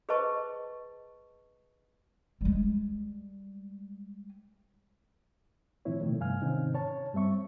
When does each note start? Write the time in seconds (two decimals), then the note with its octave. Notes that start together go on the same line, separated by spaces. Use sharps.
0.09 G#4 B4 C5 D#5 A5 C#6
2.41 G3 G#3
5.85 A2 D#3 F3 C4 E4 C#5
6.02 B2 D#3 A3
6.20 G2 C3 F5 G#5 F6
6.42 G#2 C3 D#3 C4 C#4 D#4
6.75 C#5 A5
7.13 G2 G3 C4 E5 C#6